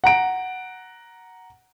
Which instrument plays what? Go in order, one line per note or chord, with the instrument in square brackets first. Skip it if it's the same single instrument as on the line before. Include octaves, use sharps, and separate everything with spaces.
[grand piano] F#5 A#5 D7